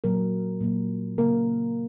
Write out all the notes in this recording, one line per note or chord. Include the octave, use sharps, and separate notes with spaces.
A#2 F#3 A#3 A#4
A#2 F#3 A#3
C#3 A#3 A#4